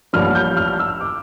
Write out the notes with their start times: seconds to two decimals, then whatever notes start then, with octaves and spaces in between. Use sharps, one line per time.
0.13 A1 G2 F3 A#3 F6
0.35 G6
0.57 F6
0.79 E6
1.01 D6